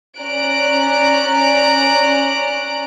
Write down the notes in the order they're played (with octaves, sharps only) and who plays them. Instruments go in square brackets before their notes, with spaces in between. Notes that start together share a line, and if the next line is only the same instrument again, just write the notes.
[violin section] C#4 D5 A#5 F#6 D7